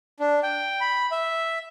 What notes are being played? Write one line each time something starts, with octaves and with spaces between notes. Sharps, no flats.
D4
G5
B5
E5